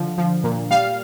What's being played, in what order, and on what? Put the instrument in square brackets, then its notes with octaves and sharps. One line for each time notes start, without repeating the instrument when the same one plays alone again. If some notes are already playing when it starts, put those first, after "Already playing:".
Already playing: [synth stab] D3 F3
F3
A#2
G3 F5